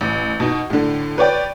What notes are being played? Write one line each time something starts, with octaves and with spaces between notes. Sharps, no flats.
A1
B2 D#4
A2 D3
B4 C#5 D5 G5